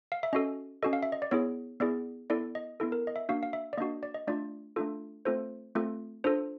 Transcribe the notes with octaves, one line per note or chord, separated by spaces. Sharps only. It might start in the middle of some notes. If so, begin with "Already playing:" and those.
F5
E5
C#4 F#4 A4 D#5
C#4 F#4 A4 D#5
F5
E5
D#5
D5
B3 E4 G#4 C#5
B3 E4 G#4 D5
B3 E4 A4 D5
D#5
B3 E4 A4
A#4
D#5
E5
A#3 D4 F#4 F5
F5
E5
D5
A#3 D4 F#4 D#5
D5
D#5
A3 D4 F4 D5
A3 D4 F4 A4
A3 C4 F4 A4 C5
A3 C4 F4 A4
D4 F4 A4 C5